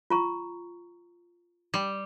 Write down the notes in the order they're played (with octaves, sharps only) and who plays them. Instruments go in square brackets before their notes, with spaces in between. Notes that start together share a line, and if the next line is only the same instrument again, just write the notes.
[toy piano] F4 A#5 C#6
[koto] G3